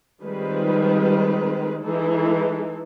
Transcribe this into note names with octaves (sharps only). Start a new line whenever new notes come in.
D#3 F3 G3 G#3 C4 B4
E3 G#3 D#4 A4